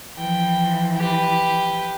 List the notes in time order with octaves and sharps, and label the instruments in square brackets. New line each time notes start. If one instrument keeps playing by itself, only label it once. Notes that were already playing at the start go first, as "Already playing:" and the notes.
[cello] E3 F3 [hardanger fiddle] G5
[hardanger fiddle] G4 B4